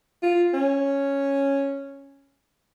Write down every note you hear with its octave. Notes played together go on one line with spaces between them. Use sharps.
F4
C#4